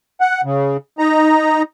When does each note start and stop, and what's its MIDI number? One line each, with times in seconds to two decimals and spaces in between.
0.21 0.41 78
0.44 0.77 49
0.98 1.62 63
0.98 1.62 82